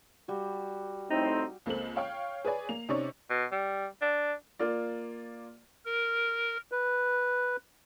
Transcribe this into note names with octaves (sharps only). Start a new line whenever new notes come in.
G3 F#4
A2 C4 D#4
C#2 A#3 C4 A4 F#7
C#5 F5 G5 C#6
G#4 B4 C#5 D5 G#5
A#3 F7
C3 C#4 D#4 D5 C#6
B2
G3
D4
A#3 F4 D5
A#4
B4